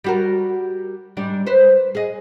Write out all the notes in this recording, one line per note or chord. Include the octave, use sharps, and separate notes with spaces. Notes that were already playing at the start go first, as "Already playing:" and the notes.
G3 F#4 A#4
G#2 G3 D4
B4 C5
G#4 D#5